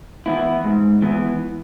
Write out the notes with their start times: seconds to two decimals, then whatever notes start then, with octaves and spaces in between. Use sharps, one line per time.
0.26 E3 B3 E4
0.64 G#2
1.02 E3 B3 E4